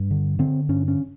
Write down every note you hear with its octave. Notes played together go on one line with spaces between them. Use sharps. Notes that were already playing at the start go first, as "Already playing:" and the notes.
Already playing: G2
D3
D3 C4
G2 C#4
C#4